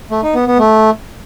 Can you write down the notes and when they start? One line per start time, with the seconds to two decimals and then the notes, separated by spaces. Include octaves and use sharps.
0.11 A3
0.23 D#4
0.35 B3
0.47 B3
0.59 A3